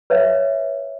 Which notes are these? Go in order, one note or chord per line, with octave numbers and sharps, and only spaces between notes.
B4 C#5 E5 F5